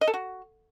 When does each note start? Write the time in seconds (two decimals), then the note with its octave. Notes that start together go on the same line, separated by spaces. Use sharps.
0.01 D#5
0.07 A4
0.14 F#4